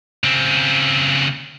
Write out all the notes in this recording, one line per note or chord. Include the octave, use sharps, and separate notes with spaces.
C#3 C4